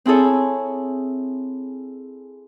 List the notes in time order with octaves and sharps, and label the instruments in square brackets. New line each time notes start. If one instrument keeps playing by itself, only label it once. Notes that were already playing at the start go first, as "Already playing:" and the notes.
[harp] C4 E4 G#4 A4 C#5